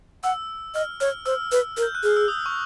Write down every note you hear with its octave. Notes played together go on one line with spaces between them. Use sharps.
F#5 E6
D#5 F6
C#5 F6
C5 E6
B4
A#4
G6
F#6
G#4 F6
E6
D#6
C#6